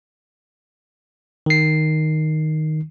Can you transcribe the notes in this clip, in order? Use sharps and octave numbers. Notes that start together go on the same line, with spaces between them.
D#3 C7